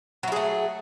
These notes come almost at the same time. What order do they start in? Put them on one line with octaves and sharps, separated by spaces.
F#3 E4 G#4 A3